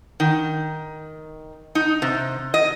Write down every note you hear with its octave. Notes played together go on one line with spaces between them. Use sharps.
D#3
D#4
C3
D#5